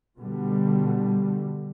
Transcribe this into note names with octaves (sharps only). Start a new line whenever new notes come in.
B2 D3 G3